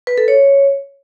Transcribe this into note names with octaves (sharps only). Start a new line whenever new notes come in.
B4
A4
C#5